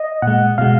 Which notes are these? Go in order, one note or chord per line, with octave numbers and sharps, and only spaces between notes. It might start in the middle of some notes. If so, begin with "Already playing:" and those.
Already playing: D#5
A#2 G#3 F#5
B2 G#3 F5